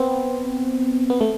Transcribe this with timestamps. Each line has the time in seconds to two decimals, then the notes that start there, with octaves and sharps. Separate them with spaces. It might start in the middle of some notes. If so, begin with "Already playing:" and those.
Already playing: B3 C4
1.10 B3
1.21 A3